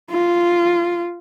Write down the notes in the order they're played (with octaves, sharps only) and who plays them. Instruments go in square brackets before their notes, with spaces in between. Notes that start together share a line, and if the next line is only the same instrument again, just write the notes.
[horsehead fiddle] F4